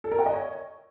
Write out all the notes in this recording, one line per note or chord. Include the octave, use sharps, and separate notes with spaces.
A4
A#4
F#5
D#5
C#5